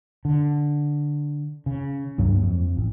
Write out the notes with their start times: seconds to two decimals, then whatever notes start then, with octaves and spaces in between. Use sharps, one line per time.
0.25 D3
1.66 C#3
2.18 C#2 G2 F#3 A#3
2.43 F2
2.77 A1